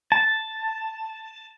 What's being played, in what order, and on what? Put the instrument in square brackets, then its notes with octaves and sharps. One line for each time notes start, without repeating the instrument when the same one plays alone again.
[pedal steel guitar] A5